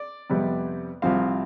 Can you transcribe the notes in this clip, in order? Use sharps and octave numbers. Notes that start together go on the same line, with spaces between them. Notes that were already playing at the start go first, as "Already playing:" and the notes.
Already playing: D5
F2 C3 G3 B3
C2 C3 F3 C4 F5